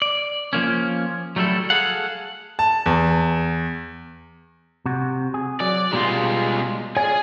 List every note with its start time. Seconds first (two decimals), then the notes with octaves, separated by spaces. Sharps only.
0.02 D5
0.53 F3 A#3 C#4
1.36 F#3 G3 A3 E4 A4
1.70 G#4 A4 F5 F#5
2.59 A5
2.86 E2
4.86 C3 F#4
5.34 G#4
5.61 F#3 D5
5.93 B2 G3 G#3 D#4 F4
6.96 G#4 C#5 D5 F5 G#5